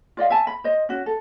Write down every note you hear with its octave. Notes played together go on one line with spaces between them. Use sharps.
F4 D5 D#5 F5
E5 G#5 A5
B5
C5 D#5
C#4 F#4
A4